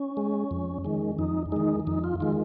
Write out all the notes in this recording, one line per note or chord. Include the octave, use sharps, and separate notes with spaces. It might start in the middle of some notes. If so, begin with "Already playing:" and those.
Already playing: C#4
G#3
F2
D#3 G#3
F2 D#4
D#3 G#3 D#4
F2 D#4
F4
D#3 G#3 F4